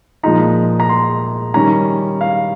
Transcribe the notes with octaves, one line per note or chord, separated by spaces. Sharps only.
A#2 F3 G#3 D#4 A#5
A#5
C6
D#3 G3 C#4 A#5
F5